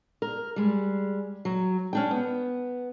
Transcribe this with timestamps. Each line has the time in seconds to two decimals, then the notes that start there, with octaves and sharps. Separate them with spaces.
0.22 A#4
0.56 G3 G#3
1.45 F#3
1.93 C#4 D4 G5
2.11 B3